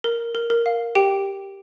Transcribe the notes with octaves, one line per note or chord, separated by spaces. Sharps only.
A#4
A#4
A#4
F5
G4 G5